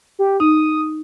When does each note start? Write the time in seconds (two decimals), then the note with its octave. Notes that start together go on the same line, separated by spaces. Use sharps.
0.19 G4
0.40 D#4 D#6